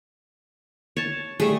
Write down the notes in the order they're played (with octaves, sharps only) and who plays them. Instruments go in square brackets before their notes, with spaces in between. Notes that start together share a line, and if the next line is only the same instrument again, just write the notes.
[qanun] C#5 A5
[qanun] G3 A3 [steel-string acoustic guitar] G#4